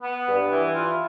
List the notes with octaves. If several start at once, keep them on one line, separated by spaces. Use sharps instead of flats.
B3
G2
E3
F4